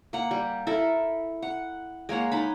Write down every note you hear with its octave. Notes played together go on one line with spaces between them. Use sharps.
A#3 F#5
G3
E4 A4 A#4 E5
F#5
G#3 A#3 C#5 F#5
D#4 A5 B5